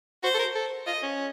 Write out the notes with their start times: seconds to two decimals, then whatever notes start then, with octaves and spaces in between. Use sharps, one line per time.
0.23 F#4 C5
0.34 A4
0.39 A#4
0.55 A4
0.87 F4 D#5
1.03 C#4